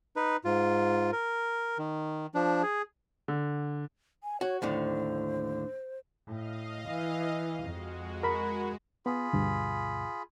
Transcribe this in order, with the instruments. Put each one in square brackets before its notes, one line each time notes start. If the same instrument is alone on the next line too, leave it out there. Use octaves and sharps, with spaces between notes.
[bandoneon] D#4 B4
G#2 F4
A#4
D#3
F3 D4
G#4
[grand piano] D3
[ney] G#5
[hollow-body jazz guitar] F#4 [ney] C#5
[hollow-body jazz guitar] D#2 A2 D3 [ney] C5
[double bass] A2 [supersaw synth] D#5 F5
[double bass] E3
[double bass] F2 [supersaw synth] G#3 F#4
[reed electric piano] A#4 B5
[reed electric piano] B3 [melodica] F4 G#4 B5
[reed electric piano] D2 G2 B2